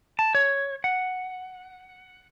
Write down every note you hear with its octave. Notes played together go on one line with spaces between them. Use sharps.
A5
C#5
F#5